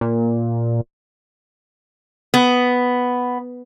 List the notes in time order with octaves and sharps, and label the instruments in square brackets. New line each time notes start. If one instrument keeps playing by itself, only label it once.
[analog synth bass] A#2
[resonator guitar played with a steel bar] B3